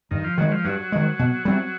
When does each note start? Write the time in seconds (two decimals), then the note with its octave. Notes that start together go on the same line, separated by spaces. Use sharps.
0.11 G2 D#3
0.24 F3
0.38 D#3 F#3 G#3
0.52 F3
0.64 G2 F#3
0.92 D#3 G#3
1.19 B2
1.45 G3 C4